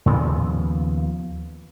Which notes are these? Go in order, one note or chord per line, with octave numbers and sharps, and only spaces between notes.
D#2 C#3 F3 B3